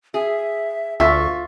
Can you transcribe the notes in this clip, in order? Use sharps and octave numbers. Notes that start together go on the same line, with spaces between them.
G#4 E5
D2 F4 E5 C#6